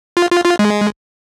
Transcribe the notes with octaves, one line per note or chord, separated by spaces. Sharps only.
F4
F4
F4
G#3